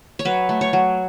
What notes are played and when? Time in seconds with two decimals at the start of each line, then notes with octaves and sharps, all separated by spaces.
0.19 C#5
0.25 F#3 B4
0.49 A3
0.61 C#5
0.73 F#3